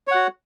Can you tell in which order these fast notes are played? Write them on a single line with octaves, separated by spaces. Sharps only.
C#5 F#5 F#4